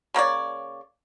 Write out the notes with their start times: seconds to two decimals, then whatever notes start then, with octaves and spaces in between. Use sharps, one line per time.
0.14 C#3 A#3 C#5 D5